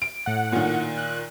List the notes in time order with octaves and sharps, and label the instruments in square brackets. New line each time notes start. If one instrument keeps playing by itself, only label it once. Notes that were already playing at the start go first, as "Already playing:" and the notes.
[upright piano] D7
[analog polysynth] A2 F#5
[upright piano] A#2 D#3
[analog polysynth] F#6